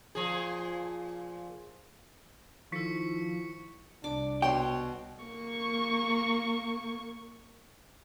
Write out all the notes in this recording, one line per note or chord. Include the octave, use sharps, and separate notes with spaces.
A#2 F3 G#4
D#3 F3 E4 A4 C#6 B6 C#7
C2 D4 D6
B2 C#5 G5 C6
A#3 C#6